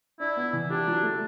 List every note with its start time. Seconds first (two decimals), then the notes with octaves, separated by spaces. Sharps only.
0.20 D4 E4
0.37 B3
0.53 E3
0.70 D4 G4
0.87 F#3
1.03 A3